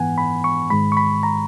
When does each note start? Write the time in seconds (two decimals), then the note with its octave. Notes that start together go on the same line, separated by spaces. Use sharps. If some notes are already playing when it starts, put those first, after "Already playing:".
Already playing: G#2 E3 B3 F#5 G#5
0.18 B5
0.44 C#6
0.70 G#2 D#3 G#3 B5
0.92 C#6
0.97 B5
1.23 A#5